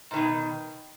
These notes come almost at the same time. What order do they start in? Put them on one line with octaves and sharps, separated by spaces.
G#2 D#3 B2